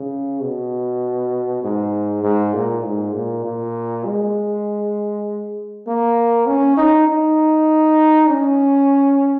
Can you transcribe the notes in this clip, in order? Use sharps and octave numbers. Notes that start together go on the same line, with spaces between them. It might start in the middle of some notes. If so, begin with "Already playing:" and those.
Already playing: C#3
B2
G#2
G#2
A#2
G#2
A#2
A#2
G#3
A#3
C#4
D#4
D#4
C#4